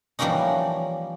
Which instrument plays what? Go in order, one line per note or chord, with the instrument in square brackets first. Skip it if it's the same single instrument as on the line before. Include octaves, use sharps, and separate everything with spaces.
[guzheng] E3 F3 G3 A#3 C#4 D#4